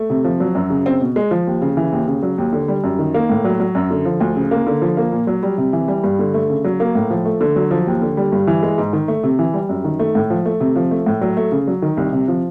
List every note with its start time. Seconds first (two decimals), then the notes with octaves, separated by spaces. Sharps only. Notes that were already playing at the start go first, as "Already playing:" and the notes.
Already playing: A3
0.10 C3
0.24 F3
0.40 F#3
0.55 F#2
0.70 C#3
0.86 C4
1.01 B2
1.16 G#3
1.31 F3
1.47 D#2
1.62 C#3
1.77 E3
1.92 D#2
2.08 C#3
2.23 F#3
2.38 D#2
2.53 D3
2.68 G3
2.84 F#2
2.99 D#3
3.14 A#3
3.30 A2
3.44 F#3
3.60 F#3
3.75 F#2
3.91 D3
4.05 F3
4.20 D2
4.36 C#3
4.51 A#3
4.67 D3
4.82 F3
4.97 A#3
5.12 A#2
5.27 F#3
5.43 G3
5.58 C3
5.73 E3
5.88 G3
6.04 G2
6.19 D3
6.34 A3
6.50 C#3
6.64 F#3
6.80 A#3
6.95 A2
7.10 F3
7.25 A3
7.41 D3
7.56 F#3
7.71 F3
7.87 D#2
8.02 D3
8.17 G3
8.32 G2
8.47 E3
8.63 G#3
8.78 G#2
8.93 D#3
9.08 A3
9.23 C3
9.39 E3
9.54 G3
9.69 F#2
9.84 D#3
9.99 A3
10.15 A2
10.30 F3
10.45 A3
10.60 C3
10.76 F3
10.91 A3
11.06 A2
11.21 F#3
11.37 A3
11.52 C#3
11.67 F#3
11.82 D#3
11.97 C2
12.13 C3
12.28 F3